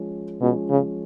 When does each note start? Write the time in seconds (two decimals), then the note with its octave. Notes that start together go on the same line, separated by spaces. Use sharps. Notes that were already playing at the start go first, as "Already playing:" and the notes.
Already playing: F3 G#3 C#4
0.41 B2 F3 G#3 C#4
0.70 C#3